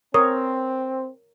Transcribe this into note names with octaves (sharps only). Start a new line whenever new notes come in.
C4 A#4 C#5 D#6